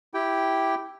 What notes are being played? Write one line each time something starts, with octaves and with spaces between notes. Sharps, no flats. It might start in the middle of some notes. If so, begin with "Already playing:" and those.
E4 G4 G5